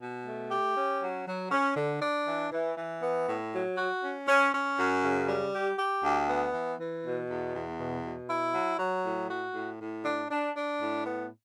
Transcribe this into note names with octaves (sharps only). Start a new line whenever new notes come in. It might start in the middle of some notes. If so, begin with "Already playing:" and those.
B2
A3
G4
C#4
F#3
F#3
C#4
D3
D4
E3
E3
E3
B3
A2
F#3
F#4
C#4
C#4
C#4
F#2
C#3
G3
G4
G4
D2
B3
E3
E3
B2
E2
E2
B2
B2
E4
F#3
F#3
A2
F#4
A2
A2
D4
D4
D4
A2
B3